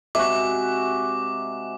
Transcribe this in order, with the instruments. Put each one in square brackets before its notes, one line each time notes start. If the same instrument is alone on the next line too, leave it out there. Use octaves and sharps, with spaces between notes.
[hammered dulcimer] C3 G#3 F#4 [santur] E5 [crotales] D6